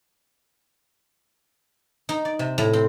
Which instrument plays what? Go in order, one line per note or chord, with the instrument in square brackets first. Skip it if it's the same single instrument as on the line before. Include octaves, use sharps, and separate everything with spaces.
[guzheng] D#4
D5
C3
A2
C4